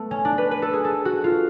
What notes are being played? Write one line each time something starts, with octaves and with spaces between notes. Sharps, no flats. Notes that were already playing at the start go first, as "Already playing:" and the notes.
Already playing: A3 B3
C#4
D4
B4
B4
A4
G#4
A4
F#4
F4